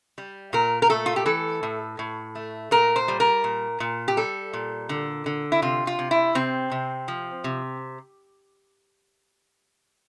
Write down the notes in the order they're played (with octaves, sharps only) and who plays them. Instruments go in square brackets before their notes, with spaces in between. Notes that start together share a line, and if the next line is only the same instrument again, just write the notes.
[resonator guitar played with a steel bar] G3
A#2 A#4
A#4
A3 A4
F4
G4
E3 A4
A2
A2
A3
A#2 A#4
C5
G3
A#4
A#2
A#2
G4
G3 A4
A#2
D3
D3
E4
C3 F4
F4
C3
E4
C3 C4
C3
F3
C3